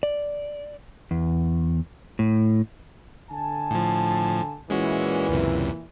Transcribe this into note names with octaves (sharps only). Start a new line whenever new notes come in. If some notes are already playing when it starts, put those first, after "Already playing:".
D5
E2
A2
D3 G#5 A5
A2 F3
A#2 E3 G#3 C#4 F#4
C#2 F#2 C3